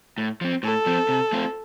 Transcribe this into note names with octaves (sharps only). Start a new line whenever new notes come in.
A2
F3 C4
A2 A4
F3 C4
C3
A3 C4 F4